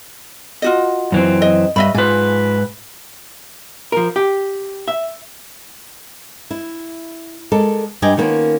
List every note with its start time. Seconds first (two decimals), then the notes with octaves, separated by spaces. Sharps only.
0.62 F4 F#4 D#5
1.12 F#2 E3 C4
1.42 D#5
1.76 G2 D#5 E5 B5
1.95 G#2 F4 B4 G#5
3.92 F3 A#4
4.16 G4
4.88 E5
6.51 E4
7.52 G#3 A4 A#4 D5
8.02 G2 G4 D5 D#5 G#5
8.17 D#3 G3 A#3 B3 C#4 F4